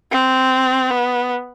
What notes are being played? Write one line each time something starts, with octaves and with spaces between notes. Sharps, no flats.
C4
B3